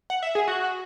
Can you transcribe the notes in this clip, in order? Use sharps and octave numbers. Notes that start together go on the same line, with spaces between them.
F#5
E5
G#4
F#4